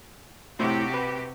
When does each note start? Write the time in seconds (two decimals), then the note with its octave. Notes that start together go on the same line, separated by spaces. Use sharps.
0.59 A2 C3 E4 F#4 G4 C5
0.94 B4